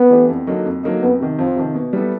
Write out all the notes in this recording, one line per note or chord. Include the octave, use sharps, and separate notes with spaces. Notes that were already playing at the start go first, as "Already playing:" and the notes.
Already playing: B3
E3 A3 D4 G4
F2
D3 F#3 A#3 D#4
F2
D3 F#3 A#3 D#4
F2 B3
C3 D#3
F2 F3
C3 D#3
B2
G3 B3 E4 A4